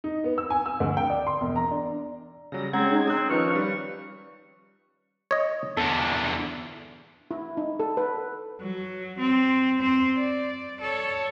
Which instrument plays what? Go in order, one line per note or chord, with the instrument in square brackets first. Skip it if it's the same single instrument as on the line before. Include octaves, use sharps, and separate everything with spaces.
[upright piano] D#4
B3
E6
G#5
E6
D2
G5
D5
C6
E1
A#5
D4
[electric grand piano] C#3 F#3 G3 [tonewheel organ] A#6
[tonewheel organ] G#3 C#4 G#6 [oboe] C4 [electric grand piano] F#5 A#5
[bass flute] D#4
[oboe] C4 [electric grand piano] D#6 F#6
[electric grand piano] D#3 F3 D#4 [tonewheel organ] C#4 F5 [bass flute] B4 [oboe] C#6
[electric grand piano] G3
[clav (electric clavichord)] C#5 D#5
[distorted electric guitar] E2 D3 [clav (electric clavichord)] A4
[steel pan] E4
D#4
A4
B4
[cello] F#3
C4
C4 C5
D5
A4 C#5